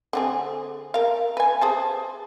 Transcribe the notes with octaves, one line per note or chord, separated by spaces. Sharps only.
D3 C4 G#4
A#4 F5
B4 G#5
G#4 C5 A5